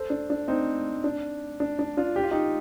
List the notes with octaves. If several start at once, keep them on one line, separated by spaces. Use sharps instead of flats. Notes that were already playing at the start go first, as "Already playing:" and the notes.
Already playing: A4 C5
D4
D4
C4 D#4
D4
D4
D4
D4 F4
G4
F4
D#4 G4